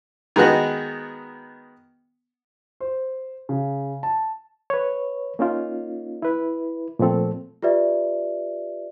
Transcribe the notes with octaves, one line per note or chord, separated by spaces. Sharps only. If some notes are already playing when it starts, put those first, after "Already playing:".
D#3 G#3 B3 F#4
C5
C#3
A5
B4 C#5
A#3 C#4 D#4 F4
E4 B4
A#2 F3 A3 C4 A4
F4 G4 B4 D5 E5